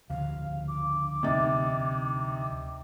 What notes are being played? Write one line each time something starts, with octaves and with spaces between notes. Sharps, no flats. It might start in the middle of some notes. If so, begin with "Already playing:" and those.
D2 C#3 F3 F5
D6
C3 D#4 A6